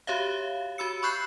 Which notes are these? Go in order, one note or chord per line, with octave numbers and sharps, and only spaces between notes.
F#4 G4 C#5 E5 F5
F#4 B5 E6 C#7
B5 C#6 E6 F#6 G6 C7